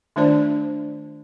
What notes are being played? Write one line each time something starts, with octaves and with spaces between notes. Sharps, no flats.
D#3 A3 D4 F4 C5 D5